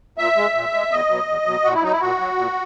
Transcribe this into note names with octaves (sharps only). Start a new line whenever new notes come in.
A#2 E5
G#3
A#2
G#3
E2 D#5
B2 F#3
E2
B2 F#3
A#2 F#4
E4
F#3 D#4
E4
A#2 F#4
F#3
A#2